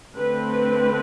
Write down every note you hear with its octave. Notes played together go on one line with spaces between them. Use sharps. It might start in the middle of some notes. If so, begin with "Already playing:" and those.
D3 A3 C4 B4